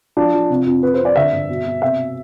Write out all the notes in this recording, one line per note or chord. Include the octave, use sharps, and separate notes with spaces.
F3 D4
F3
C3
F2
C3 B4
C5
F2
D5
D3 E5
G2
B2
B2
C3 E5